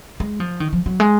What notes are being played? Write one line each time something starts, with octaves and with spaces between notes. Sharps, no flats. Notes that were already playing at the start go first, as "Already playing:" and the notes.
G#3
F3
D#3
F3
F#3
G#3